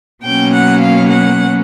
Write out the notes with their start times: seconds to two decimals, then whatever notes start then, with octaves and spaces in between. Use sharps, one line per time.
0.24 B2 F#3 A#3 C#4 G5
0.54 F#5
0.82 F5
1.10 F#5